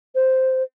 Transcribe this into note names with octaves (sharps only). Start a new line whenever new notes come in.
C5